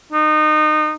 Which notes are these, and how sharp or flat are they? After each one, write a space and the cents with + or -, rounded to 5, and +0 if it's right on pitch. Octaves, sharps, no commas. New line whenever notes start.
D#4 -25